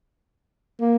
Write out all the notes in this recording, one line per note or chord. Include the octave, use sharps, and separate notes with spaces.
A#3